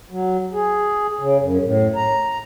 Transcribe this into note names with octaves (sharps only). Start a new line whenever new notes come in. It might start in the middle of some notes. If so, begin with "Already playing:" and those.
F#3
G#4
C#3
F#2
A2
A#5